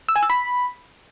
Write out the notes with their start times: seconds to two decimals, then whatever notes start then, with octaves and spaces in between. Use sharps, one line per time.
0.09 E6
0.16 G#5
0.23 E6
0.30 B5